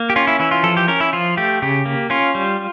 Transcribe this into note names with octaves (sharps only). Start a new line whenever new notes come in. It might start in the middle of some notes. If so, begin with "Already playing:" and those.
Already playing: A#3
G4
C#4 F4
E4
E3 E4
F4
F3 A4
G4
C#4 A#4
E4
F3 F4
A3 G4
C#3 G4
A#3
C#4 F4
G3